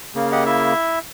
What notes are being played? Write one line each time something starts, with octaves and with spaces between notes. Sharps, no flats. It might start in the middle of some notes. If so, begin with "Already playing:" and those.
C#3 A#3
G4 D#5 F#5
E4 E5